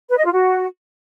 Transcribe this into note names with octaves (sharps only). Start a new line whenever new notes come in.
B4
D#5
F4
F#4